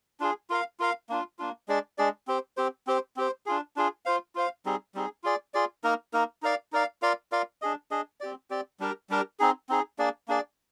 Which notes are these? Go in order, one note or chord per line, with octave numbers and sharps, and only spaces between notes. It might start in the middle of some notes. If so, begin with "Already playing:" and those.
D4 F4 G#4
F4 A#4 F5
F4 A#4 F5
A#3 D4 F4
A#3 D4 F4
G#3 D4 G#4 D5
G#3 D4 G#4 D5
C4 G4 C5
C4 G4 C5
C4 G4 C5
C4 G4 C5
D4 F4 G#4
D4 F4 G#4
F4 C5 F5
F4 C5 F5
G3 C4 D#4 G#4
G3 C4 D#4 G#4
F4 G#4 D5
F4 G#4 D5
A#3 D#4 A#4
A#3 D#4 A#4
D#4 A#4 D5 F5
D#4 A#4 D5 F5
F4 A#4 D5 F5
F4 A#4 D5 F5
D4 G#4 D#5
D4 G#4 D#5
C4 G4 D5
C4 G4 D5
G3 D4 G4 A#4
G3 D4 G4 A#4
C4 D#4 G#4
C4 D#4 G#4
A#3 D4 G#4 D5
A#3 D4 G#4 D5